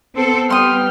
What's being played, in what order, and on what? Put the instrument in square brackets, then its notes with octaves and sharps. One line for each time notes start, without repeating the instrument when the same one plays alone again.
[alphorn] B3 [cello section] C4 A4
[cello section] G3 [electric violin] G5 F6 [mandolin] C6 D#6